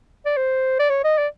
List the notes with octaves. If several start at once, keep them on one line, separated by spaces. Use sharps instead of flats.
D5
C5
D5
C#5
D#5
D5